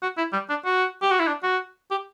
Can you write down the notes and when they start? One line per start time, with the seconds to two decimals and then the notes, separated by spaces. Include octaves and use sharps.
0.02 F#4
0.17 E4
0.33 G3
0.50 D4
0.65 F#4
1.02 G4
1.11 F#4
1.20 E4
1.27 D4
1.43 F#4
1.91 G4